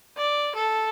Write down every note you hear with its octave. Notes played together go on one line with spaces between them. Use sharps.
D5
A4